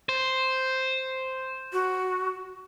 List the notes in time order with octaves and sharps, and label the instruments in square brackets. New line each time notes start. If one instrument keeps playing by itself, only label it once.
[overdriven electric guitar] C5
[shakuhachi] F#4